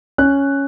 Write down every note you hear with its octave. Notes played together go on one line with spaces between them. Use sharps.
C#4 F#6